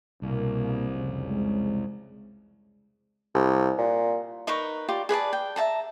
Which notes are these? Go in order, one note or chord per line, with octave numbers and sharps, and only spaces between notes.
C2 B2 A#3
F1 F2 C#3
G#3
C2
A#2
D#4 A#4 B4 C#6
F4 G4 D5
G#4 B4 D5 A5
G5
E5 F5 A5 A#5